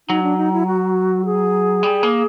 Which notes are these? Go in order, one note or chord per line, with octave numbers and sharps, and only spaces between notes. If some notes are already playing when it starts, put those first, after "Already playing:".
F#3 D#4
D4
D#4
E4
F#4
G#4
G3
A#3